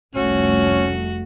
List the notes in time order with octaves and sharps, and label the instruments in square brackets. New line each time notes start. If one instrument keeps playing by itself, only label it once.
[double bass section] F1 C2 A3 [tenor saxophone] C#4 [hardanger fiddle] F#4